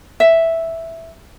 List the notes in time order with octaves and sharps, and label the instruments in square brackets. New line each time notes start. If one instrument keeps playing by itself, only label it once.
[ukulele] E5